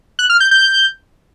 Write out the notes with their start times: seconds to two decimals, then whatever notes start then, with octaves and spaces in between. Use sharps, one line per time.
0.19 F#6
0.30 F6
0.40 G6
0.51 G6